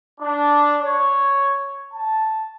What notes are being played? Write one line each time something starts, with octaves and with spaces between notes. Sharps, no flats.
D4
C#5
A5